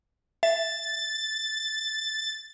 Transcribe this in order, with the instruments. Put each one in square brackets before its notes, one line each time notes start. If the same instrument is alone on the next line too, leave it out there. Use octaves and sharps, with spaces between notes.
[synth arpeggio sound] E5 [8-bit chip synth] A6